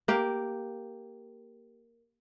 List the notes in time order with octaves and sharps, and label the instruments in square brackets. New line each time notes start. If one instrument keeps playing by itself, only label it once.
[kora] A#3 G4